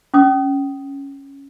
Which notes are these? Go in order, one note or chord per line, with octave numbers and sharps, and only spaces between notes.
C#4 D#6